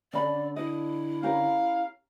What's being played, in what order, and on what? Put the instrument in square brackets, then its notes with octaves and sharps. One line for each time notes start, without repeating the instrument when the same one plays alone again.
[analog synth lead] D3 [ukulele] C#4 B5 [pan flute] D5
[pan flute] E4 [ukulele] D#5
[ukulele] C#4 G4 A#4 [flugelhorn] F5